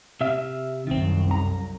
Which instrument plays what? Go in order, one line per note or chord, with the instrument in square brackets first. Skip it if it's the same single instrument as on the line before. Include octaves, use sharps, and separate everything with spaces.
[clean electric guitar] C3 E5 F5
[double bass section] C2 F#2 [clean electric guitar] D#3 C4
[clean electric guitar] A#5